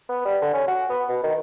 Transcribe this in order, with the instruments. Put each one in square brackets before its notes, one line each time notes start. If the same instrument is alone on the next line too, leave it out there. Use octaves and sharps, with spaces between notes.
[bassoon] B3
G3
D3
C#4
F#4
B3
B2
D#3